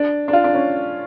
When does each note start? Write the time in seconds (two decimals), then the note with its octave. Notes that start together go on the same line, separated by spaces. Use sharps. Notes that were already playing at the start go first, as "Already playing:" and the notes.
Already playing: D4
0.28 D4
0.33 F4
0.44 D4
0.55 C#4